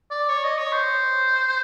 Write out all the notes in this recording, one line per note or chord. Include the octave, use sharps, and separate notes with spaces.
D5
C#5
D#5
C#5
C5